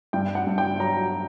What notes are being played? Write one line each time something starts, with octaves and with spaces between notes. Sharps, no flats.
G2 G5
F#5
G2
G5
F#3 A#5